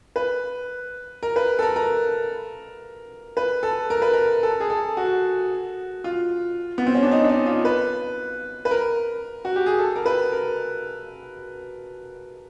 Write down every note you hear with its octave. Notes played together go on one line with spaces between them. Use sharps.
B4
A#4
B4
A4
A#4
A#4
B4
A4
A#4
B4
A#4
A4
G#4
A4
F#4
F4
B3
C4
C#4
D4
D#4
D4
D#4
F4
B4
B4
A#4
F#4
G4
G#4
A4
A#4
B4
A#4